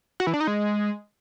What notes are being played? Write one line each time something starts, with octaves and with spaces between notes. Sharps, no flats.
F#4
E3
D4
D#4
G#3